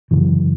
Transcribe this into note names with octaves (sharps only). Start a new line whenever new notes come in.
F#2 C#3 E3